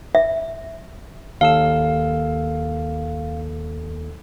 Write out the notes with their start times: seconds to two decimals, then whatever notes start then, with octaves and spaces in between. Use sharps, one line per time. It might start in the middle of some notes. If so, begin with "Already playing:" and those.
0.15 E5
1.41 D#2 A4 F5 E6